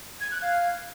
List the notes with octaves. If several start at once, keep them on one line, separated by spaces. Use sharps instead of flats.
G#6
F#6
F5